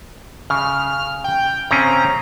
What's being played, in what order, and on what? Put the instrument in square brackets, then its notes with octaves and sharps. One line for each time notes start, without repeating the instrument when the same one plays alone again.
[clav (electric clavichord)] C#3 [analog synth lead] F6
[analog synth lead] G5
[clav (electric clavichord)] C#3 C4 C#4 [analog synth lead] A#5